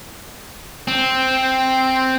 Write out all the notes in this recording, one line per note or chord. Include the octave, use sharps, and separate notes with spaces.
C4